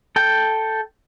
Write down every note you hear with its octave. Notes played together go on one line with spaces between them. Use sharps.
A4 G5